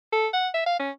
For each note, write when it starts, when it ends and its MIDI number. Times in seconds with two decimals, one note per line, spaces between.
0.13 0.28 69
0.33 0.48 78
0.54 0.63 76
0.67 0.76 77
0.80 0.90 61